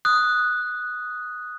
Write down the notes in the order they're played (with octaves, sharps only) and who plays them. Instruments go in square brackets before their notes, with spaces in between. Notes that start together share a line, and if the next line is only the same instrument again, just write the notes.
[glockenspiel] D#6 F#6